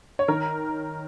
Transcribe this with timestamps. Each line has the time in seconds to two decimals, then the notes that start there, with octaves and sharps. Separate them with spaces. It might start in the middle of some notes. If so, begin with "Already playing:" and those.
0.19 C#5
0.28 D#3 A#4